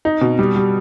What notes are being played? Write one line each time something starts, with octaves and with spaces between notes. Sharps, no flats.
D#4
B2
G3
G3